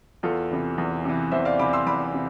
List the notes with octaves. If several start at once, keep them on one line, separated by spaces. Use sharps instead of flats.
E2 F4 A4
C3 E3
E2
C3 E3
E2 C5 E5
D5 F5
C3 E3 B5 D6
C6 E6
E2 B5 D6
C3